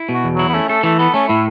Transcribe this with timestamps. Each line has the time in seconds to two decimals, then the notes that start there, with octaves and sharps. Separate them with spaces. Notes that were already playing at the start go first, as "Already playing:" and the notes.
Already playing: E4
0.09 B2 F#4
0.24 E2
0.34 F#3
0.39 E4
0.49 B3
0.54 A3 C#4
0.69 A3 A4
0.83 E3 A3
0.99 B3 A4
1.14 A3 C#4
1.28 A2 E4